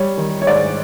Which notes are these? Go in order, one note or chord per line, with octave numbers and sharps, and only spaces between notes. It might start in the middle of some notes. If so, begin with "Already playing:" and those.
Already playing: G3 C#5
D#3
C#5
G#2 D5